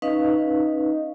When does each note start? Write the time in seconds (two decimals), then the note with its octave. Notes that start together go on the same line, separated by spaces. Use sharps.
0.02 C#4 D#4 B4 D#5 F5